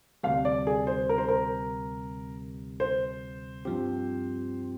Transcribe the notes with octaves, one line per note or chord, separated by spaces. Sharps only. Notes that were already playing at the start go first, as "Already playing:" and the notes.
D2 C3 G3 F5
D5
G#4
C5
A#4
C5
A#4
C5
G2 F3 C4 G4